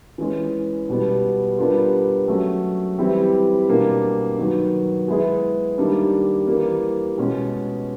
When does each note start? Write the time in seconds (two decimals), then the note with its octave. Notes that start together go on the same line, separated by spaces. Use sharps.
0.18 E3 G#3 C#4
0.89 B2 G3 B3
1.58 G3 B3 D4 F4 A#4
2.28 F#3 A3 C#4
2.99 E3 G3 C4 E4 G4
3.68 B2 G3 A#3 D4 G4
4.38 D#3 F#3 B3
5.08 G#3 B3 E4 G#4
5.78 D#3 G3 A#3 D4
6.47 E3 G3 A#3
7.18 B2 G#3 C#4